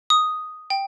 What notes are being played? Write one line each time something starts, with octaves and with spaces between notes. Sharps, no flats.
D#6
G5